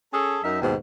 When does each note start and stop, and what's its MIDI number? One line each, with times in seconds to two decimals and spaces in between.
0.13 0.40 61
0.13 0.40 68
0.13 0.40 69
0.44 0.61 42
0.44 0.61 63
0.44 0.61 70
0.44 0.61 76
0.61 0.75 39
0.61 0.75 44
0.61 0.75 47